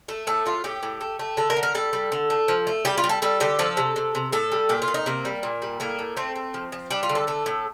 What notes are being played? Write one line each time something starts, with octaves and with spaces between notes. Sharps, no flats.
A3 A4
A2 A4
A2 F4
A2 G4
A2
A3
A3
D3 A4
A#4
D3
A#4
G3 A4
G3
D3
A3
F3
A3
G3 G4
F4
G3
A4
G3 A4
D3 G4
F3 A4
C3
C3
C3
A2 A4
G3
A#2 G4
F4
A#2
D#4
C3 A#3
G3
A#2
G3
A2 A#3
A2
A3 C4
A3
F3
F3
G3 D4
F4
D3
A4
A3 A4
A2